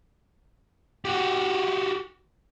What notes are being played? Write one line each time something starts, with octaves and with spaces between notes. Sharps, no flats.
F#4 G4